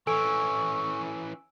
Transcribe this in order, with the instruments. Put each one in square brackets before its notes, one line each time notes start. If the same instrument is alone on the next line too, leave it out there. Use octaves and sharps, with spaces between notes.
[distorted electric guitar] E3 C#4 [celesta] A4 [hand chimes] G#5 E6 D7 [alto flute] C#6